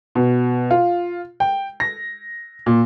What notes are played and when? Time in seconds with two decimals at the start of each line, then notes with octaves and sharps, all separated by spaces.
0.15 B2
0.71 F4
1.40 G5
1.80 A#6
2.66 A#2